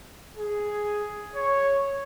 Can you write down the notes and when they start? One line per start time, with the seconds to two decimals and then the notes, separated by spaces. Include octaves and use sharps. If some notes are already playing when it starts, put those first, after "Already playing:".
0.37 G#4
1.35 C#5